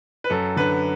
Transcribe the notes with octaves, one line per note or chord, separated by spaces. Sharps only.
B4
F#2 A4
D3 B4